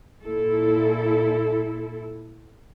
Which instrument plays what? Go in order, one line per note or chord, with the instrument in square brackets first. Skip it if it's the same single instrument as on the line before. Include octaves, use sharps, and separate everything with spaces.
[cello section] A#2 E4 A4